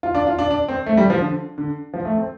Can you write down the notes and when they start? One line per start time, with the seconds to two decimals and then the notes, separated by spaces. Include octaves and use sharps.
0.03 F4
0.15 D4
0.27 F4
0.39 D4
0.51 D4
0.68 C4
0.86 A3
0.97 G3
1.10 F3
1.21 D3
1.58 D3
1.94 F3
2.05 A3
2.17 C4